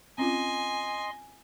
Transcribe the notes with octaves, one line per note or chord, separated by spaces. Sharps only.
C4 C#4 F4 D#5 G#5 C6